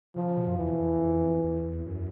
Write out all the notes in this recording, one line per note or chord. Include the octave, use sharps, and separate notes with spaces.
C#3 F3
C#3
B2
F#2
E2 E3
F2
E2
F2
E2
F#2